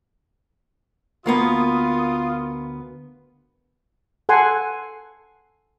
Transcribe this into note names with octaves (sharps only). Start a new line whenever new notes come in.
D2 A#3 B3 F4 D#6
A4 F#5 G#5 C6